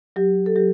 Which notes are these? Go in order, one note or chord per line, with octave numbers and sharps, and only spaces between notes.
F#3 G4
A4
F#3 G4